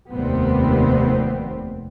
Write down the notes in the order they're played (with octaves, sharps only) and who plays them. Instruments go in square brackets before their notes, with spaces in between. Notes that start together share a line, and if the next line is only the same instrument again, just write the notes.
[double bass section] F1 D#2 C3 G3 B3 C4